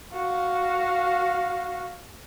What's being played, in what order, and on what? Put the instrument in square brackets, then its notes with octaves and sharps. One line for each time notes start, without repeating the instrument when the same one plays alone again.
[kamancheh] F#4 F5